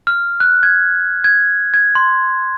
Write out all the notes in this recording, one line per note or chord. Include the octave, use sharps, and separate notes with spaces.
F6
F#6
G#6
G#6
G#6
C6